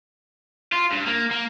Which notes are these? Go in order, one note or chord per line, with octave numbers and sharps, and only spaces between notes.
F4
G2
A#3
A#3